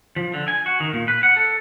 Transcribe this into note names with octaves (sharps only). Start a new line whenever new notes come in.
F3
D3
G#5
F#4
D#3
A#2
B4
F#5
A4